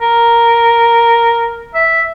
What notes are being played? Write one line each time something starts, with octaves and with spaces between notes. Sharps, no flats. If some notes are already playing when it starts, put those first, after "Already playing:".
A#4
E5